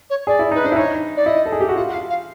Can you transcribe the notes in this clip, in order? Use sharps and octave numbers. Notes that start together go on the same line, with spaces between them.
C#5
G#4 D5
E4
D#4
B4
D4 C5
E4
D#4 C#5
D5
E4 D#5
A4
G#4
G4
F#4
F4 F#5
F#5
F5
F5